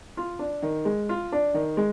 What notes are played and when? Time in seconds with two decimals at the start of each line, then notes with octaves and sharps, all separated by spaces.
0.17 F4
0.39 D4
0.62 D#3
0.85 G#3
1.09 F4
1.32 D4
1.54 D#3
1.77 G#3